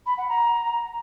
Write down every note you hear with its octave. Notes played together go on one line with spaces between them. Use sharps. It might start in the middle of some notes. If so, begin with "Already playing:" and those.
B5
F#5
A#5